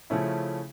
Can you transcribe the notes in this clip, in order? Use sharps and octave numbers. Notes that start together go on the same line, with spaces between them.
C#3 F3 A3 C#4 E4